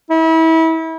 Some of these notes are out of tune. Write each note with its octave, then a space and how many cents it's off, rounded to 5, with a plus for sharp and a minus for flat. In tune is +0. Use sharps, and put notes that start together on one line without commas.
E4 -30